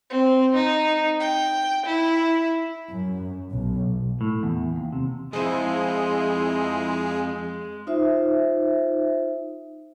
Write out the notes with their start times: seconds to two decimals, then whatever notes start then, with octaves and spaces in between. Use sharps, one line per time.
0.10 C4
0.55 D#4
1.20 G5
1.85 E4
2.90 F#2
3.50 B1
4.21 A2
4.43 E2
4.76 D#2
4.93 C3
5.33 F2 G#3 E4 G#4 C5 D#5
7.87 D#4 F4 C5 E5